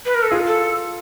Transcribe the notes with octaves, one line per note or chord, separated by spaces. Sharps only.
B4
A#4
A4
F4 G#4
A4